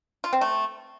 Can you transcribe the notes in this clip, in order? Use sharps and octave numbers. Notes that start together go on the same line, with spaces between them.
F4
C4
A3